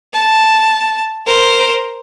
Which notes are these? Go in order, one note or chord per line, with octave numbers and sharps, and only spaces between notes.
A5
A#4 C5